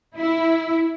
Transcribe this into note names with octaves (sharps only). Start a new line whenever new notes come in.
E4